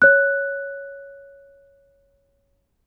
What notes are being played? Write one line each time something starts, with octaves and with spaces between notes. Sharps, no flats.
C#5 F#6